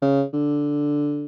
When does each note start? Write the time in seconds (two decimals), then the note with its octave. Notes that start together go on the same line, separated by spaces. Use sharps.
0.02 C#3
0.33 D3